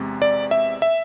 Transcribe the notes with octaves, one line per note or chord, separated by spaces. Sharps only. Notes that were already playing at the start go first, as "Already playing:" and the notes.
Already playing: E2 C3 G#3
D5
E5
E5